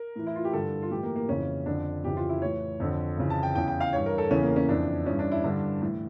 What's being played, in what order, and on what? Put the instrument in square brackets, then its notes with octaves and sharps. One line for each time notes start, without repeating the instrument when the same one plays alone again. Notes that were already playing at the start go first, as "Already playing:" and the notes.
Already playing: [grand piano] A#4
A2 E3
E4
F4
G4
G2 D3 A4
F4
A2 E3 G4
A#3
A#3
F2 C#3 E3 C#4
F2 D3 D4
F2 C#3 E3 G4
F4
E4
A2 E3 C#5
F2 D3
F2 C#3 E3
A5
G5
E2 C#3 E3 G5
G5
F5
G2 E3 C#5
A#4
A4
E2 C#3 E3 C#4
A#3
C#4
F2 E3 D4
G2 E3 C#4
D4
E4
G2 D3 D4
A2 E3